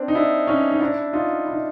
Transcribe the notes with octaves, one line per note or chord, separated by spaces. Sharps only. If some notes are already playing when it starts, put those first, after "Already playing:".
Already playing: C4 D4
D#4
D4 E4
C#4 D#4
D#4
D4 E4
D#4 F4
E4
D#4